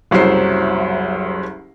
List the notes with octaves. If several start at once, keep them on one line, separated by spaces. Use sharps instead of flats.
F#1 C2 F#3 C5 C7